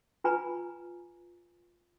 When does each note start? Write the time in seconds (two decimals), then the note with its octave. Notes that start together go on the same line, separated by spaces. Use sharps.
0.24 F4 B4 G#5 A#5 B5